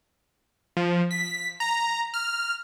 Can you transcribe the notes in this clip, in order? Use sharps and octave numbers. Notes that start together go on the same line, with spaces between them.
F3
B6
A#5
F6